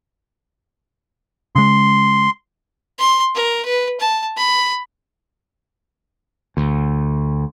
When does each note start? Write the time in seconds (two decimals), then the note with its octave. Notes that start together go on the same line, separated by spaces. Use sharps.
1.56 C#3 G#3 C6
2.99 C6
3.35 A#4
3.65 B4
4.00 A5
4.37 B5
6.57 D2